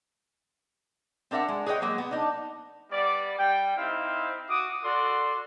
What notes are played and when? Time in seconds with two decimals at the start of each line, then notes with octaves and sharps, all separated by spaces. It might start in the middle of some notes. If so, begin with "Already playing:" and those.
1.31 C4 D4 A#4 E5 F#5
1.49 G#3
1.66 G#4 B4 C#5 D#5 G5
1.82 F#3 G#3 A#3
1.98 B3
2.11 D4 D#4
2.91 G3 B3 D5
3.39 G3 G5
3.77 C4 D#4 E4 C5 F5
4.49 F#4 D6 D#6
4.84 F#4 A4 D5 C6